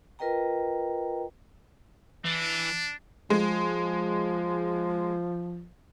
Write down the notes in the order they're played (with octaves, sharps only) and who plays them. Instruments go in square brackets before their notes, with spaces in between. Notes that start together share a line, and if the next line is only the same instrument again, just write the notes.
[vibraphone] F4 A#4 B4 D#5 G5 A#5
[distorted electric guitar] E3 [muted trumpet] D4
[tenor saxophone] F3 [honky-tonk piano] G#3